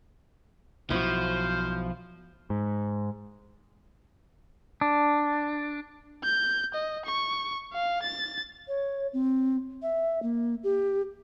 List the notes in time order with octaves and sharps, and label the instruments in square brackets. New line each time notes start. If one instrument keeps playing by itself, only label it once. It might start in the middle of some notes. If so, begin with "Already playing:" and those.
[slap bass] B1 [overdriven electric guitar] F3 [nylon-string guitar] E4 F#4 [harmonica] C5 F5
[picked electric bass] G#2
[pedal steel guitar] D4
[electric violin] G6
D#5
C#6
F5
A6
[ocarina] C#5
C4
E5
A#3
G4